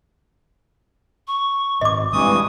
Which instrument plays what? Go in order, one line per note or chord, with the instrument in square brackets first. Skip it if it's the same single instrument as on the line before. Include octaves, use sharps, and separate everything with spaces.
[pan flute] C#6
[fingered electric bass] G#1 [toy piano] D#5 D6
[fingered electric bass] D1 G#3 C4 [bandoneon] G2 E3 D#6 [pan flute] C#6